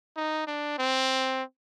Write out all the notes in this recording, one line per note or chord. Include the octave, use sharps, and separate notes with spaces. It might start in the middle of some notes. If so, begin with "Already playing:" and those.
D#4
D4
C4